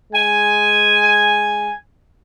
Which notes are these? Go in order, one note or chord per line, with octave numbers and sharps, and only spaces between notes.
G#3 G#5